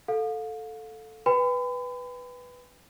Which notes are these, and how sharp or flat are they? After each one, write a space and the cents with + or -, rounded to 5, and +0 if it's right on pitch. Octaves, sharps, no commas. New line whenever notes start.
A4 +0 F5 +30
B4 +0 G5 +40 B5 +40